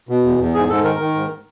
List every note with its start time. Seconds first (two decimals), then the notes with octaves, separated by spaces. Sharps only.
0.09 B2
0.24 E2
0.39 E2
0.54 G#2 G#4
0.69 G#2 A4
0.84 D#3 A#4
0.99 D#3
1.15 G#2